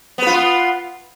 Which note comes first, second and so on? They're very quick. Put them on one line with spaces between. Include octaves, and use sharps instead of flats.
B3 B4 F4